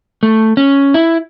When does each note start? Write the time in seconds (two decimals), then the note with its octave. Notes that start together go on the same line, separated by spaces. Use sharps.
0.23 A3
0.57 C#4
0.94 E4